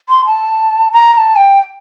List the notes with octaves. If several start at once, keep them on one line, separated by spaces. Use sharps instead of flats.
C6
A5
A#5
A#5
A5
G5